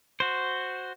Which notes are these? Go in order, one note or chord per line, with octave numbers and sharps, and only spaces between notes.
F#4 C5